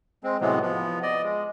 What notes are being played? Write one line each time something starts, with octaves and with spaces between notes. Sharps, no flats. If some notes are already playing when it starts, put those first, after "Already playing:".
G#3 C4
A2 C3 E3 F#3 G#3 B3
F3 B3
D5 D#5
G#3